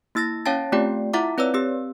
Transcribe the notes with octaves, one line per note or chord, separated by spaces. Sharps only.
A#3 E4 E6 A6 A#6
C#4 C#5 F5 G5 A5 A6
A3 C4 F4 G4 D5 G5
E4 F4 E5 F#5 A#5 D6
C4 B4 C#5 D5 E6
C4 G4 E6